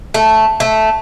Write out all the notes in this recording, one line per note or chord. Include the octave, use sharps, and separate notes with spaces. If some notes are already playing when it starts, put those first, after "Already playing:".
A3
A3